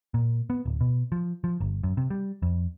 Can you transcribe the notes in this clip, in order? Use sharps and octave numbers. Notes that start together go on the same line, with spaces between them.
A#2
B3
D1
B2
F3
F3
G1
F#2
C3
G3
F2